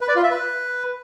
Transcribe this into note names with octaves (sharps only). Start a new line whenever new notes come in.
B4
D5
F4
E5
B4